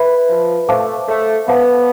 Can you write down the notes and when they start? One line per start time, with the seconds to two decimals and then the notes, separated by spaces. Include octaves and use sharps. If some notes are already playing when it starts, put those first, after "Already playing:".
Already playing: B4 E5 B5
0.29 F3
0.68 A3 C5 F5 A5 D6
1.08 A3
1.47 B3 C5 F5 A5 D6